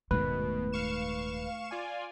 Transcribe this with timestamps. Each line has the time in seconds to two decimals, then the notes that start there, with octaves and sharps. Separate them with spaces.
0.11 D#1 G#2 B2 D#3 A3 B4
0.73 F5 C#6 E7
1.71 F4 D5 G#5